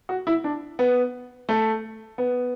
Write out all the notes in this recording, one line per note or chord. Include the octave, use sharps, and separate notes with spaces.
F#4
E4
D4
B3
A3
B3